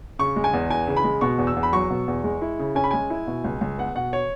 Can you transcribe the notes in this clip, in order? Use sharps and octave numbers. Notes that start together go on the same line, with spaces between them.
C#3 C#6
G#3
G#5
E2
E3 G#5
C#3
B5
G#3
B2 C#6
E2
E6
E2
B5
F#3 C#6
B2
E2
G#3
E4
C#3
C#4 G#5
B5
G#3 G#5
E4
B2
C#2
C#2
B3 F#5
B2 F#5
C#5